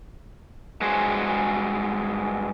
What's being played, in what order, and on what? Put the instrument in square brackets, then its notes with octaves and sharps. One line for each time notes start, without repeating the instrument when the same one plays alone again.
[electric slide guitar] G2 G#3 F#4 G#4 C5